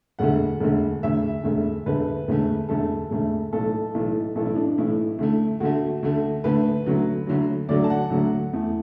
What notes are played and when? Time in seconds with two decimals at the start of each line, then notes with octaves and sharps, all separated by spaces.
0.19 E1 D2 D3 F#5
0.60 E1 D2 D3
1.03 E1 D2 D3 E5
1.44 E1 D2 D3
1.86 E1 D2 D3 A3 B4
2.28 E1 D2 D3 A3
2.69 E1 D2 D3 A3 A4
3.11 E1 D2 D3 A3
3.53 B1 A2 E3 A4
3.94 B1 A2 E3
4.35 B1 A2 E3 A4
4.46 E4
4.56 D4
4.67 D4
4.78 B1 A2 E3 E4
5.19 D2 D3 A3
5.60 D2 D3 A3 F#4
6.03 D2 D3 A3
6.44 D2 D3 A3 B4
6.86 D2 D3 F#3
7.27 D2 D3 F#3
7.69 D2 D3 F#3 D5
7.84 A5
7.90 F#5
8.10 D2 D3 F#3
8.53 E2 E3 A3